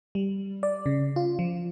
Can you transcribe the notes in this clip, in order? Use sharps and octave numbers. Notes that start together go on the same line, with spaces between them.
G3
D5
C#3
F4
F3